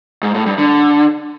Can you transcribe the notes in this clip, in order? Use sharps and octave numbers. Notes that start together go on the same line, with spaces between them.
G#2
A2
G2
D3